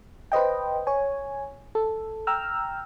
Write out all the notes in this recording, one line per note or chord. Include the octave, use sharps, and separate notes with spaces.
B4 C5 D#5 G5
C#5 G#5
A4
G5 A#5 E6 F6